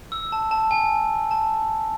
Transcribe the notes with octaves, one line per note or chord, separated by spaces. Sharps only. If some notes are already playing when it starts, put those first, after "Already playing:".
E6
A5
A5
G#5
A5